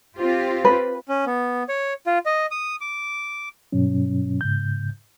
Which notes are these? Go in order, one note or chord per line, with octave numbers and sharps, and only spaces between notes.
C4 F4 G4
B4
C#4
B3
C#5
F4
D#5
D#6
D6
G2 B2 F#3 C#4
G#2 C#3 G6